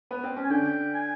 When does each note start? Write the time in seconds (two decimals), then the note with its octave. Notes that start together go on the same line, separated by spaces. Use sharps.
0.11 B3
0.24 C4
0.36 C#4
0.44 G#5
0.50 D3 D4 G5
0.94 G#5